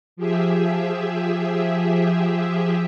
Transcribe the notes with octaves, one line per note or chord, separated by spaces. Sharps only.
F3 G4 G#4 E5